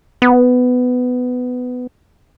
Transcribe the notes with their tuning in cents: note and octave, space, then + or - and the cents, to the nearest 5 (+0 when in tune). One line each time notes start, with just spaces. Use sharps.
B3 +15